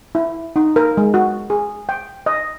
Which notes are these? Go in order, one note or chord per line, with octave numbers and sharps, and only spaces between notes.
E4
D#4
A#4
G#3
F#4
G#4
G5
D#5